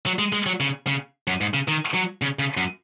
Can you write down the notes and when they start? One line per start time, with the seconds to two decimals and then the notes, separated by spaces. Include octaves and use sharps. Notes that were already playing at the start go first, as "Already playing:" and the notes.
0.06 F#3
0.19 G#3
0.33 G#3
0.46 F#3
0.60 C#3
0.87 C#3
1.27 F#2
1.41 G#2
1.54 C#3
1.68 D#3
1.94 F#3
2.22 C#3
2.39 C#3
2.57 F#2